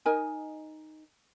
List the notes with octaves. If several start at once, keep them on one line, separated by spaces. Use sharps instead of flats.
D#4 A#4 D#5 G#5